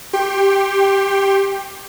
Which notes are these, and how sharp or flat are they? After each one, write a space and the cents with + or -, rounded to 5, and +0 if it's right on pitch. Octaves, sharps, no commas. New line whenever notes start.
G4 +5 G5 +10 C6 +40